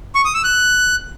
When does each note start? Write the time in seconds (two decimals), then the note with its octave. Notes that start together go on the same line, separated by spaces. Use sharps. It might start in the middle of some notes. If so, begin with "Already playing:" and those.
0.15 C#6
0.25 D#6
0.34 E6
0.44 F#6